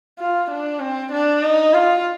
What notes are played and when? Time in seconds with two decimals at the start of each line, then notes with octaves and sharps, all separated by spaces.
0.19 F4
0.51 D4
0.81 C4
1.13 D4
1.43 D#4
1.74 F4